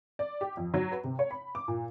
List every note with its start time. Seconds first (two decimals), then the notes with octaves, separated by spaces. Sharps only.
0.19 D5
0.41 G4
0.57 F2
0.74 F#3
0.92 B4
1.04 C3
1.19 C#5
1.31 B5
1.55 D6
1.68 A#2